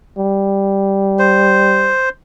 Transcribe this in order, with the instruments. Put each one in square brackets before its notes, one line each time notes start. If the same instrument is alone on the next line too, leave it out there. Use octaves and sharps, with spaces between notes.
[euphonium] G3
[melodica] C5